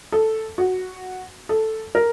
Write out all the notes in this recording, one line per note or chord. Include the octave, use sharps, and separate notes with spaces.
A4
F#4
A4
A#4